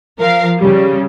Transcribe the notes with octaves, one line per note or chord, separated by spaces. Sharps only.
F3 A#4 F5
C#3 G3